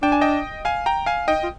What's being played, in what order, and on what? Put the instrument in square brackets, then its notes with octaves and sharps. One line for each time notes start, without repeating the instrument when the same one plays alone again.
[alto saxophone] D4 [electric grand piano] G5
[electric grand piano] G#5
D#5 G5
F5 G#5
G5 A#5
F5 G#5
[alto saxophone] D#4 [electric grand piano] D#5 G5
[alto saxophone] F4